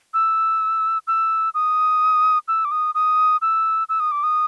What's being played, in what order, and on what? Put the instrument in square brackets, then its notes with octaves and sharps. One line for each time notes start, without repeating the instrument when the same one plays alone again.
[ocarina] E6
E6
D#6
E6
D6
D#6
D#6
E6
E6
D#6
D6
D#6